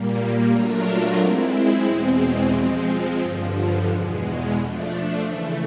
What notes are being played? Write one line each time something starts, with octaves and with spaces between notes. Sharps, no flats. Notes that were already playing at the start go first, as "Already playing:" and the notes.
Already playing: A#2 G3 A#3
F#3 A3 D4 F4 A#4
G#3 C4 E4
E2 B2 G#3 C4
F3 G#3 C4
G2 D3 F3
E2 B2 G#3
F3 A3 D4
C#3 E3 A3